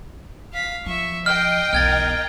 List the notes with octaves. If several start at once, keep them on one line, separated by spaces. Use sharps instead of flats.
F5 B6
F3 E5 C#6
D#5 G5 F6 C7
B1 E2 A#4 F5 F6 G#6 A6